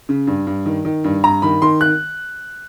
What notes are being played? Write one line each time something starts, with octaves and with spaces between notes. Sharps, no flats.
C#3
G2
G2
D#3
D#3
G2
G2 A#5
D#3 B5
D#3 C6
F#6